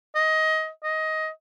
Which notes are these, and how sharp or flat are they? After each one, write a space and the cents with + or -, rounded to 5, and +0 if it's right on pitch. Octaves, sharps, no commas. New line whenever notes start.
D#5 +20
D#5 +15